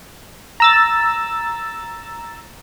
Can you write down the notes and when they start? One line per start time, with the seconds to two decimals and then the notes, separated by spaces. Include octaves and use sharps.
0.60 A#5 E6 A6